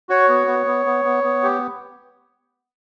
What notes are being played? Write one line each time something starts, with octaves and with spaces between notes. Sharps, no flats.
F#4 C#5
B3
B3
B3
B3
B3
B3
G4